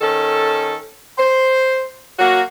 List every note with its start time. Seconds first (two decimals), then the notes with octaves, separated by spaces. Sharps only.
0.01 D#3 C#4 A4
1.18 C5
2.19 F#3 A#3 F#4